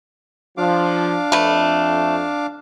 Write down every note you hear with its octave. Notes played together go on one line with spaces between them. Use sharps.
F3 D4 F5 D6
F2 A3 B4